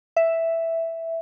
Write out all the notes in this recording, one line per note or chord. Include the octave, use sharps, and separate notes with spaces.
E5